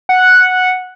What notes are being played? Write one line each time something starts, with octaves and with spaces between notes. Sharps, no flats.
F#5